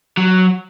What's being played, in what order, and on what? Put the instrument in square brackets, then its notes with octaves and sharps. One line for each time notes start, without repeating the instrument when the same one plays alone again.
[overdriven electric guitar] F#3